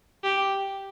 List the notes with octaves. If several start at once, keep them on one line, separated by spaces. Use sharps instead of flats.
G4